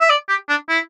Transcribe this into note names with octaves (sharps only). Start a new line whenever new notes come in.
E5
D5
G4
D4
E4